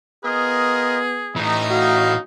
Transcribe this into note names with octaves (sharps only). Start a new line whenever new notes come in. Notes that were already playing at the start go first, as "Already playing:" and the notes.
B3 F4 G#4 A#4 D#5
A2 E3 C#4 D#4
F#4 F5